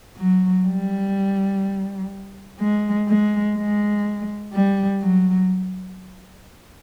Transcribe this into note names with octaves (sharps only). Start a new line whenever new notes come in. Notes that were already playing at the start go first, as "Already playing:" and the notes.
F#3
G3
G#3
G#3
G#3
G3
F#3